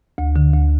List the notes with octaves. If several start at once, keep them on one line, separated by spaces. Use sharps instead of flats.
D2
D3
D2